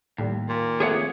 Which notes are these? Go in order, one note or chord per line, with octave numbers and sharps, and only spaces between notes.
D#2 A2 G3
A#2
F3 A3 C4 G#4 C#5 F#5